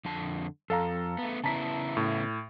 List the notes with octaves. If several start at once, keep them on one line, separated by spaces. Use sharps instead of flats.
F2 D3 A5
F2 A4 F5 A#5
A3 B3
C#3 B3 E4 A5 A#5 B6
A2